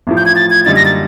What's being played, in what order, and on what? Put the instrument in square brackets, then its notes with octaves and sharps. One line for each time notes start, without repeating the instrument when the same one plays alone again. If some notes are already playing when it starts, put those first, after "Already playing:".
[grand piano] A1 A2 F3
[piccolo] G6
G#6
A6
G#6
[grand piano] F#2 D3 G3 A#3 D#4 [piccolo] A6
[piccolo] A#6
A6